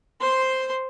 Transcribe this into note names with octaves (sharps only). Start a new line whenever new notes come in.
C5 C6